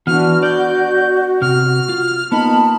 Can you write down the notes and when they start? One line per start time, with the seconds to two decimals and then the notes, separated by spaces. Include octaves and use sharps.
0.07 E3 B3 D4 F#4 F6
0.43 D5 G6
1.42 C3 F6
1.89 F4
2.32 A#3 B3 D#4 F4 A5 B5